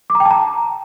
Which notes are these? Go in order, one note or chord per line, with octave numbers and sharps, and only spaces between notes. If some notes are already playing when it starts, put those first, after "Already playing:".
D6
A#5
G5
A5
A#5